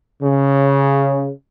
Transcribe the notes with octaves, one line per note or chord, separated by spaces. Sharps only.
C#3